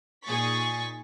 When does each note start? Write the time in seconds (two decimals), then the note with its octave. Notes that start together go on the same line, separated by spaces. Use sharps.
0.24 A#2 D#4 G#4 C#6 A6 B6